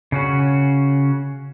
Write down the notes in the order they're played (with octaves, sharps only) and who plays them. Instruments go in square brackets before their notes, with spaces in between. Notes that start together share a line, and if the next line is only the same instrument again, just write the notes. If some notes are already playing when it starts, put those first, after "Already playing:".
[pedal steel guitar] C#3 C#4 F#4